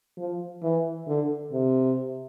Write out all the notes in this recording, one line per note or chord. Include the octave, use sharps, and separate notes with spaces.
F3
E3
D3
C3